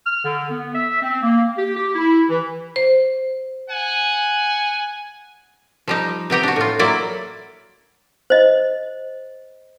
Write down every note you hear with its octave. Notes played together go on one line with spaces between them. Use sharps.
F6
D3
B3
E5
C4
A#3
G4
G4
E4
E3
C5
F#5 G#5
F3 G3 D#4
C3 B3 G4 A#5
D4 F#4
A2 F4
F#3 A#3 E4 D5
C5 D#5